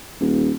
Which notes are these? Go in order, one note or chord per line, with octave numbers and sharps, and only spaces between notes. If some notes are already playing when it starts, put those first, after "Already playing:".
D#1